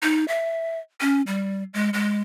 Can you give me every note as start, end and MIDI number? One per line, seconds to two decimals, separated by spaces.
0.03 0.25 63
0.28 0.79 76
1.01 1.22 61
1.27 1.64 55
1.74 1.90 56
1.94 2.22 56